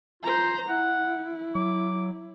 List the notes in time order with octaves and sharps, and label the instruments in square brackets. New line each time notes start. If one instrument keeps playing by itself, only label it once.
[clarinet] F4 [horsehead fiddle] C5 A#5
[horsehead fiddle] E4 [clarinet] F#5
[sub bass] F#3 [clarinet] D6